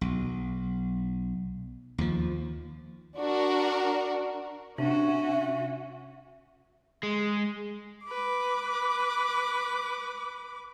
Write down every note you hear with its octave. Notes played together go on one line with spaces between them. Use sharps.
B1
D#2 F3
D4 F#4 A#4
C3 C#4 D4 F#4 E5
G#3
B4 D6